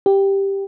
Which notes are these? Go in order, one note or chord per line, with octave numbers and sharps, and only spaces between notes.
G4